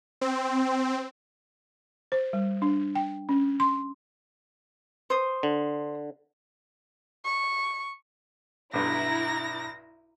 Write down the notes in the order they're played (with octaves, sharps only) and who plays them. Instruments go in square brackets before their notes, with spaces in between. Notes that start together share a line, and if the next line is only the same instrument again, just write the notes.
[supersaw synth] C4
[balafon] C5
G3
D4
G5
C#4
C6
[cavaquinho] C5 D#6
[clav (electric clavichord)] D3
[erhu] C#6
[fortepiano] B1 G2 [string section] E4 A#5 [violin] A#6